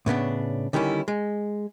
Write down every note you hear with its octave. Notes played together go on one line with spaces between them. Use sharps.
A2 C#3 B3 D4
D3 D#3 G3 C#4 E4
G#3